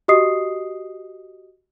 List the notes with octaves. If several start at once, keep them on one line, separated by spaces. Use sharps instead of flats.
F#4 G4 D#5 D#6 C7